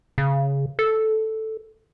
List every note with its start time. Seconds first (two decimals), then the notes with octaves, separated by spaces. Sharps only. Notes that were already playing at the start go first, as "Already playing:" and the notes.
0.18 C#3
0.79 A4